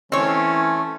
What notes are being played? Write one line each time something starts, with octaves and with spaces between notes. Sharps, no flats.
E3 A3 C4 C#4 C#5